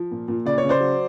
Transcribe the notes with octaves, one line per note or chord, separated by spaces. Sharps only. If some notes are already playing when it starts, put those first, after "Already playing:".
Already playing: F3
A#2
A#2
C#3 D5
C#5
C#3
C5 D5
F#3